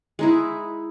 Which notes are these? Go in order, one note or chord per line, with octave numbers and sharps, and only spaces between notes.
G#3 D#4 E4